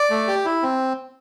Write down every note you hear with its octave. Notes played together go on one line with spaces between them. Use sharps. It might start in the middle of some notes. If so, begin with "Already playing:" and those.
Already playing: D5
A3
G4
E4
C4